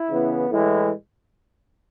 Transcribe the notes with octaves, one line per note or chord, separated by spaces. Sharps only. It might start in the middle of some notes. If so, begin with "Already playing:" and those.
Already playing: E4
C#3 E3 B3
A2 E3 G#3 E4